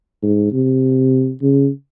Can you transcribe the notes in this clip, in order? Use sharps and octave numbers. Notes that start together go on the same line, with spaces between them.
G#2
C3
C#3